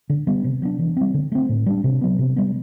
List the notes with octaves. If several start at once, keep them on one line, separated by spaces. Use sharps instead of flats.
D3
G3 B3
C3
F#3 B3 D4
E3
G3 C4
D3
A3 C4
A2
G3 D4
C3
F#3 B3
C3
G3 B3